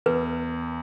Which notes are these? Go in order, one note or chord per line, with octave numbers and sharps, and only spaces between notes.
E2 B4